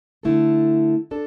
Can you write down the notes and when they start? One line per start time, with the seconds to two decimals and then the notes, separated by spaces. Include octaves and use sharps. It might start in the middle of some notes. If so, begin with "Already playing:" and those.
0.23 D3 A3 E4 A4
1.11 D4 A4